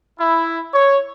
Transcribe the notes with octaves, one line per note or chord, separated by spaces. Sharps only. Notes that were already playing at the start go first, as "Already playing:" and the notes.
E4
C#5